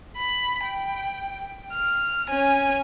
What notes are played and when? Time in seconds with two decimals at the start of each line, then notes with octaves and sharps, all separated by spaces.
0.17 B5
0.65 G5
1.73 F6
2.29 C#4 G#5